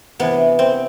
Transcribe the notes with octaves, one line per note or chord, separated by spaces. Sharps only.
C3 E3 B3
C4